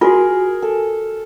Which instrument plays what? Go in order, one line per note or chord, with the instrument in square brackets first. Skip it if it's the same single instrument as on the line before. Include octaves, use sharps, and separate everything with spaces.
[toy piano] F4 F#4 [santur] G#4 A#4
[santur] A4